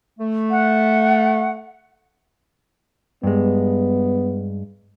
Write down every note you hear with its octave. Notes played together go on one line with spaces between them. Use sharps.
A3
F#5
G2 G#3 B3